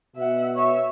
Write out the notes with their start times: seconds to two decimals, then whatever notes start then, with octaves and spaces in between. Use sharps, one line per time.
0.16 B2 E5 F#5
0.56 C#5 E5